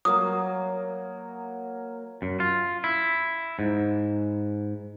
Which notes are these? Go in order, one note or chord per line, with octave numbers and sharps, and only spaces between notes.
F#3 A#3 D#6
F#2
F4
E4
G#2